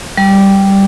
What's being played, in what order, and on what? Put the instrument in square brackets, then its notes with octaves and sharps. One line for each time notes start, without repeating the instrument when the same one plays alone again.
[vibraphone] G3